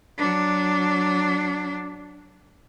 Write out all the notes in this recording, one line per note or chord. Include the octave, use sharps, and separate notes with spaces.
F#3 D4